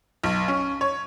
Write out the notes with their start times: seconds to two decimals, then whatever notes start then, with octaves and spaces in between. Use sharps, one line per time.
0.23 B1
0.48 C#4
0.81 C#5